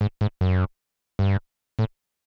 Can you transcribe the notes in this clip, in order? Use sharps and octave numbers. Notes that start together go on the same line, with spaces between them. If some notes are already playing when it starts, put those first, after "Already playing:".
G#2
G#2
F#2
G2
A2